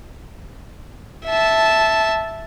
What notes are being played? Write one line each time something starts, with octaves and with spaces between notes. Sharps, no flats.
E5 A5